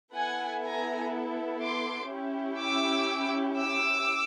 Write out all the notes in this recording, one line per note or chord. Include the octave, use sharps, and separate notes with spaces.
B3 E4 A4 F#5 G#5
G#5 A#5
C6 D6
C#4 E4 G4
D6 E6
D6 E6